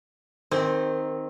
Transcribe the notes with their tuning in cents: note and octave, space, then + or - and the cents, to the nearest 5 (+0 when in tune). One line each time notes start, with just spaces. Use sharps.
D#3 +0 C4 +0 G#4 -45